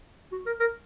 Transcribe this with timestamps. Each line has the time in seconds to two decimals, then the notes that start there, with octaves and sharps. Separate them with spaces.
0.32 F#4
0.46 A#4
0.60 A#4